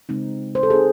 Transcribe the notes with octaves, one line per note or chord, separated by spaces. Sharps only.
C#3 G#3 C4 D#4
C5
A4
C#3 G#3 C4 D#4 G#4